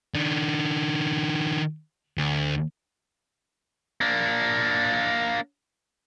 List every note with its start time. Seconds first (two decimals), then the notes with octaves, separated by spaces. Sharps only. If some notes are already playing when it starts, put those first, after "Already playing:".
0.14 D#3 D4
2.18 D2
4.01 A#3 D4